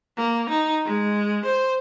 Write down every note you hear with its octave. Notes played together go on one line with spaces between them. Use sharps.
A#3
D#4
G#3
C5